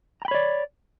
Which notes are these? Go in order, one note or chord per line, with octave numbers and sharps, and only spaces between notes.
C#5 D5 G5 A#5 B5